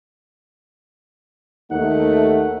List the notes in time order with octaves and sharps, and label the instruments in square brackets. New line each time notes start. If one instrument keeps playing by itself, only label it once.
[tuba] D#2 [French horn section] A3 [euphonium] D#4 [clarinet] F#5